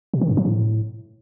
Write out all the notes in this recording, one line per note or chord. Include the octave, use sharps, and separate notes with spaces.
B2
D#3
G2
F3
A2